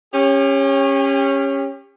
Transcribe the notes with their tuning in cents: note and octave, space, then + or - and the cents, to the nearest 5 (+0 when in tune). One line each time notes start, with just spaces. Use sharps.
C#4 -10 G4 +35